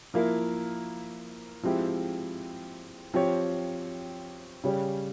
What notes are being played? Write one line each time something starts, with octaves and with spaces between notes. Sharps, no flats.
F3 A#3 E4 A#4
F3 G#3 C4 E4 G4
F3 C4 G4 C#5
C#3 G3 C#4 G4